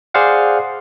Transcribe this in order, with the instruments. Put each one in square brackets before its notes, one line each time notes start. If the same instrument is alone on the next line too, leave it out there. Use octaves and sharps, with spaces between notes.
[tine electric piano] G#4 C5 D5 F5 F#5